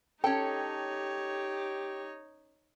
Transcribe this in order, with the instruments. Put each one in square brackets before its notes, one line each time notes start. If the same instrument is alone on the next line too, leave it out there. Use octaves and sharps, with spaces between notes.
[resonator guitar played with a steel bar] C#4 A4 [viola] D#4 C#5 [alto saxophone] G4 [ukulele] G5